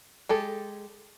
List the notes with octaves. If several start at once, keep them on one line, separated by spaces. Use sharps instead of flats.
G#3 G4 A4